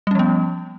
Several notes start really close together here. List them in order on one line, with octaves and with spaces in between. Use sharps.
G3 C#4 F3 B3